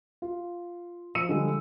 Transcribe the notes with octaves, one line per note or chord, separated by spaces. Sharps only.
F4
F3 E6 C#7 D#7
D3 F3 G3 G#3